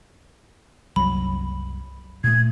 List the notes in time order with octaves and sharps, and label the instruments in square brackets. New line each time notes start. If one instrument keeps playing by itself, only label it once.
[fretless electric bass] F#1 C2 F#3 [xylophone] B5
[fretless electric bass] A#2 A3 [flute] G#6